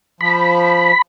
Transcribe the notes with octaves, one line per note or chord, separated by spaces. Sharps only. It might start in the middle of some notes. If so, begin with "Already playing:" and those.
F3 B5